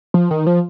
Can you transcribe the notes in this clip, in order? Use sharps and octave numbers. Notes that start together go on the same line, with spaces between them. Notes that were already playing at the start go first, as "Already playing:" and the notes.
F3
D#3
F3